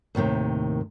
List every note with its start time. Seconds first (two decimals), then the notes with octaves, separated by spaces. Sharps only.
0.15 D#2 A2 C3 D#3